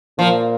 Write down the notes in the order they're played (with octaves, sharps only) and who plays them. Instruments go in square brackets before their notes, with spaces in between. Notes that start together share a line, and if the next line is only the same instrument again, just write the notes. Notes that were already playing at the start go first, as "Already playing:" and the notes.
[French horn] A#2 [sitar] F3